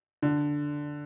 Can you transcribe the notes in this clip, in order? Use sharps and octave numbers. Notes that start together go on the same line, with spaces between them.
D3